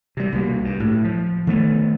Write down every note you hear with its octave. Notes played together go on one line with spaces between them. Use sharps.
C3 G3
C2 B2 A#3
G2
A2
F3
D#3 A3 B3